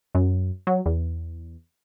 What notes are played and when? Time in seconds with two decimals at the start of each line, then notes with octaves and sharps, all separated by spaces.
0.15 F#2
0.67 F#3
0.86 E2